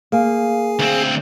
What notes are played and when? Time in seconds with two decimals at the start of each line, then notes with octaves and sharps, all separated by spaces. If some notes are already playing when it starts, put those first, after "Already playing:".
0.12 A#3 G#4 F5 G#5
0.79 D2 C4